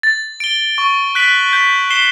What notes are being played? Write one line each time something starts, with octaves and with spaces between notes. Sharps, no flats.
A6
D7 G7
C#6
F#6 B6 D7 F#7
G6
C7 E7 G7